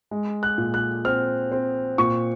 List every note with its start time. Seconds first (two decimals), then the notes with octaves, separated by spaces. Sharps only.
0.11 G#3
0.43 F#6
0.58 A#2
0.74 F#6
1.05 C4 F6
1.52 C4
1.98 A#2 C#6